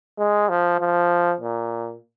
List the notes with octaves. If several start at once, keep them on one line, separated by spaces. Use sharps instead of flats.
G#3
F3
F3
A#2